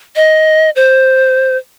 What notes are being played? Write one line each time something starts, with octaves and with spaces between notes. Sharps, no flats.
D#5
C5